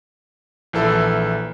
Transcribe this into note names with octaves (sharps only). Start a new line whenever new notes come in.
A#1 E3 A4